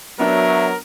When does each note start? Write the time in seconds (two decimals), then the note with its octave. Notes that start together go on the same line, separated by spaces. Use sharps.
0.19 F#3 B3 D4 A#4 E5